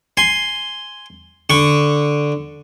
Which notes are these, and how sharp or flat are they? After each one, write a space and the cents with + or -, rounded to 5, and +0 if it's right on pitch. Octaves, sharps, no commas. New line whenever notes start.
G#5 +0 C6 +0
D3 +0 C#6 +0